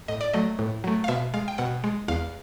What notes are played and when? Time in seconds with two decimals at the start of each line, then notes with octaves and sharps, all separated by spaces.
0.08 A2 D#5
0.21 D5
0.33 F#3 A3 D#5
0.59 A2
0.84 F#3 A3
1.04 F5
1.08 B2 E5
1.34 G#3 F5
1.48 G5
1.58 B2 F#5
1.84 G#3
2.08 E2 F5